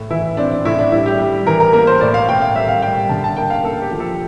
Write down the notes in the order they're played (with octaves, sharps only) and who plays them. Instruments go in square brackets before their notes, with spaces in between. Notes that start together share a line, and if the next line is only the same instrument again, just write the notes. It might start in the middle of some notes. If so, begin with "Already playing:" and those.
Already playing: [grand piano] A2
E3 E4
C4 D4
D4
A2 E4
D4
G3 E4
G4
G3
E3 A#4
A#4
A#3 A#4
C5
A2 D5
F5
A2 G5
F5
G3 E5
F5
G3 G5
D3 A5
A5
A#3 G5
F5
A#3 A4
G4
F3
A4